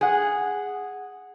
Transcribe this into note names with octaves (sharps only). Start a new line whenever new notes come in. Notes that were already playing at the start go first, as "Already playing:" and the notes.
G#4 F#5